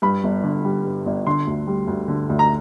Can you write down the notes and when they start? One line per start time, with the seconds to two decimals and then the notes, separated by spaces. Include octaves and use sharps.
0.02 G2 B5
0.24 G1
0.44 D3
0.65 G3
0.85 G2
1.06 G1
1.27 D3 C6
1.47 D2
1.67 G3
1.87 D2
2.08 D3
2.30 D2
2.39 A#5